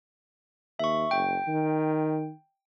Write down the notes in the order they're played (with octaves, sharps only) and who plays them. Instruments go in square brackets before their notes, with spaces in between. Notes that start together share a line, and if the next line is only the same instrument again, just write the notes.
[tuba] D#2 [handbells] E5 C#6
[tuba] F#1 [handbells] G5
[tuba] D#3